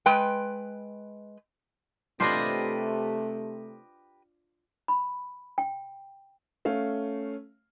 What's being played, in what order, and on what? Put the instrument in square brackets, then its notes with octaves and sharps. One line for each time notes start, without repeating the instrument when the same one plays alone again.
[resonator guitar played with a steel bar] G#3 B4 G5
[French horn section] C3 A3 [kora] D4 F4 C5 [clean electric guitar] G4 B4 D#5
[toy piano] B5
G5
[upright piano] A3 C#4 F5